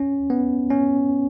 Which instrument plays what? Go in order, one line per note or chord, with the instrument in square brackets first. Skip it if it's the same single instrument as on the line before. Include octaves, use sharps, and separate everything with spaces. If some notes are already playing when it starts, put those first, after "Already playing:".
Already playing: [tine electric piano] C#4
B3
C#4